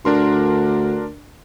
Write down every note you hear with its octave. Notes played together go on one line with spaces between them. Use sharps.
D2 D4 A#4 C6